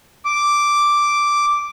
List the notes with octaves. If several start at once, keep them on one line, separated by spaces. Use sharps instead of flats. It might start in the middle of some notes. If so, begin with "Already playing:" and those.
D6